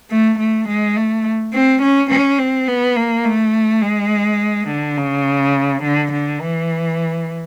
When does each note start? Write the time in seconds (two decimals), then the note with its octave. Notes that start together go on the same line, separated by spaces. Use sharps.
0.10 A3
0.39 A3
0.68 G#3
0.97 A3
1.53 C4
1.82 C#4
2.10 C#4
2.39 C4
2.68 B3
2.96 A#3
3.25 A3
3.82 G#3
4.68 D3
4.97 C#3
5.82 D3
6.12 D3
6.41 E3